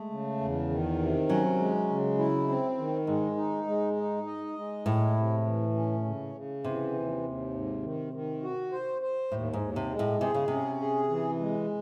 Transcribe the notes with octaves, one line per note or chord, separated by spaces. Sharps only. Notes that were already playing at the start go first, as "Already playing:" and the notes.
Already playing: G#3 A3
C#3
E2
D#3
C3
F#3 C#4
G#3
C#3
E4
C4
D#3
G#2 G#3
D#4
G#3
D#4
D#5
G#3
A2 E4
C3
E3
C#4
C#3
C#3
C3 E3
D#2
D#2
G#2
D#3
D#3
F#4
C5
C5
D#2 A2
G#2
D#2
C3
G#3
A2
C3 G#4
C#3
C3 C#4
G#4
E3
G#3